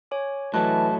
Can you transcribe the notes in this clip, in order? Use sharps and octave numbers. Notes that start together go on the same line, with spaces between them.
C#5 G#5 D6
A2 E3 F#3 A3 D#5 A5 F#6